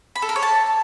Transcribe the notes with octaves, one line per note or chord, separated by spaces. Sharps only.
B5
A4
A#4
C#5
A5